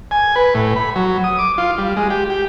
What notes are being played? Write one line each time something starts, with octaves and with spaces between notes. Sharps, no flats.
G#5
B4
A2
B5
F#3
D#6
D6
F4
G3
G#3
G4
G4